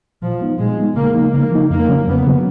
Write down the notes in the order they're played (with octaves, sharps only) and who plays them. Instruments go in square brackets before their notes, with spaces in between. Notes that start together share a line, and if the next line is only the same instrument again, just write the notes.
[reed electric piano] A#2 [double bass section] F3
[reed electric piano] G#3 B3 D#4
[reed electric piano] A#2 [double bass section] G#3
[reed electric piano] G#3 B3 D#4
[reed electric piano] C#3 [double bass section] A#3
[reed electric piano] F3 A#3 D#4
[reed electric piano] C#3 [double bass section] A#3
[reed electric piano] F3 A#3 D#4
[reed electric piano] F2 [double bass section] A#3
[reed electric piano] C#3 F#3 C#4
[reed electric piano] F2 [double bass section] B3
[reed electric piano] C#3 F#3 C#4